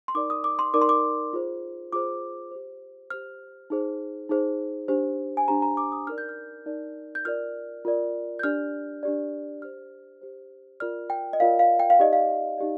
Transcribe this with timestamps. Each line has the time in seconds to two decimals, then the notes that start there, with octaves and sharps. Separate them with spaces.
0.08 C6
0.15 D#4 A#4 D5 D6
0.30 D#6
0.44 D6
0.59 C6
0.74 D#4 A#4 D5 D6
0.82 C6
0.89 D6
1.33 F4 G#4 C5
1.93 F4 G#4 C5 D6
2.51 G4 C5
3.10 G4 C5 F6
3.70 D#4 G#4 C5
4.29 D#4 G#4 C5
4.88 D4 G4 C5
5.37 G#5
5.48 D4 G4 C5 A#5
5.62 A#5
5.77 D6
5.92 D#6
6.07 D#4 A#4 D5 F6
6.18 G6
6.29 F6
6.66 D#4 A#4 D5
7.15 G6
7.25 F4 A#4 D5 F6
7.85 F4 A#4 D5
8.39 G6
8.43 D4 G4 D5 F6
9.03 D4 G4 D5
9.62 G4 C5 F6
10.22 G4 C5
10.80 F4 A#4 D5 F6
11.10 G5
11.33 D#5
11.40 F4 A#4 D5 F5
11.59 F5
11.80 G5
11.90 F5
12.00 D#4 G4 D5 D#5
12.13 F5
12.58 D#4 G4 D5